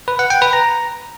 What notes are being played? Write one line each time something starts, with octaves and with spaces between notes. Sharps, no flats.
B4
F#5
G5
B4
A#5